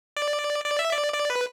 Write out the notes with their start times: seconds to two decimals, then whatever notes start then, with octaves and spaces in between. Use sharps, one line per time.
0.17 D5
0.65 D5
0.79 E5
0.92 D5
1.14 D5
1.30 B4